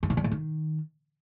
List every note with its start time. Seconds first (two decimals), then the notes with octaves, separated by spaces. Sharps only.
0.03 G2
0.10 B2
0.17 G2
0.24 A2
0.31 D#3